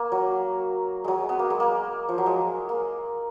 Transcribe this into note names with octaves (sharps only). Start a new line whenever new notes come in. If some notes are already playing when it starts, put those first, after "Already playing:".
Already playing: A#3
F#3
F#3 G#3
B3
A#3
G#3
A#3
F3
F#3
G#3
A#3